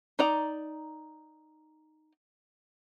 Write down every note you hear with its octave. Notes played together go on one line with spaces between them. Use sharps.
D#4 D5 A#5